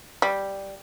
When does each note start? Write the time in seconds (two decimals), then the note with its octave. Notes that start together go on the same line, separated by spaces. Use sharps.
0.22 G3